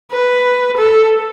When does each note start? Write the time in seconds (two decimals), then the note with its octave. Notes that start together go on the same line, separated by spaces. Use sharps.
0.11 B4
0.77 A4